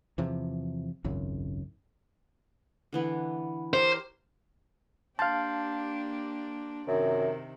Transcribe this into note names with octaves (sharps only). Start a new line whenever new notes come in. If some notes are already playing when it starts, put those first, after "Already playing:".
E2 C3 F3
G#1 C#2 F#2
D3 E3 B3
G4 A#4 C5 C#5
A#3 D4 G4 F5 A5 C6 G6 A6
F#2 C3 D#3